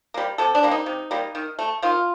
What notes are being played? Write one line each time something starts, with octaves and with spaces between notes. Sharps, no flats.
G3 A#3
C3 A4
D4
G3 A#3
D#4
C3
G3 A#3
D#3
A3
D#3 F4